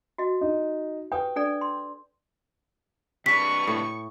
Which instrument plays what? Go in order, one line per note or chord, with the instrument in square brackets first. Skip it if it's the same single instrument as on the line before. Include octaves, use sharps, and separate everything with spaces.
[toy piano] F#4 D#5
[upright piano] D#4
[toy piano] G4 B4 D#6 [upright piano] G5
[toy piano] D4 A4 D5
C6
[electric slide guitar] C3 D4 B4 [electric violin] C#6 [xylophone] B6
[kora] A2